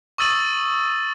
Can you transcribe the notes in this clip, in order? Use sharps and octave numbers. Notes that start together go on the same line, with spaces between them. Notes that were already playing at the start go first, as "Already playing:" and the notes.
C#6 D#6 E6 A6 D#7 F#7